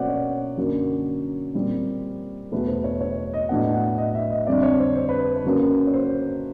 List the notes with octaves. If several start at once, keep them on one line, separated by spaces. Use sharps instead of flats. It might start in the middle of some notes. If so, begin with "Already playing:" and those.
Already playing: B2 F#3 A#3 C#4 C5 D5 F#5
C#5
F#2 D3 F#3 A#3
A#2 G3 C4 C5
E2 B2 F#3 A3 B4
C5
C#5
C#5
D#5
A2 F#3 B3 D4 F#5
F#5
D#5
E5
D#5
F2 D3 G3 D5
C#5
C5
C5
B4
B4
C#3 F#3 A#3 C#4
C#5
C5